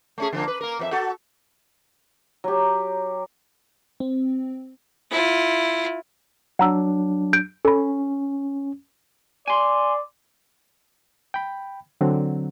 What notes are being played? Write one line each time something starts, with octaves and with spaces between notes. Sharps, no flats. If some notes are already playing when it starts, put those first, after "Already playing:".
A3 C#4 G#4
D3 F3 A#3
B4
A#3 A#4
F2 B4 E5
F#4 A4
F#3 G4
C4
E4 F4
F#3 D4 F#5 A#5 E6
G6 D7
C#4 A4 B5
D5 G#5 C6
G5 B5
D3 F#3 C4